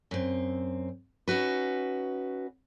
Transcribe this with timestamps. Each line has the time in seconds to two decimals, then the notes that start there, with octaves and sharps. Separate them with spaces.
0.11 F#2 C4
1.28 C#4 D#4 F#4 B4